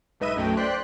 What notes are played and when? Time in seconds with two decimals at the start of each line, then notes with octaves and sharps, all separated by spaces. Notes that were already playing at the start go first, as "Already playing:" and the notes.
0.20 B1 G#2 B4 D#5 E5 D#7
0.36 B1 F#2 F#3 A3 G5
0.57 C5 D5 G5 C6 F#6 B6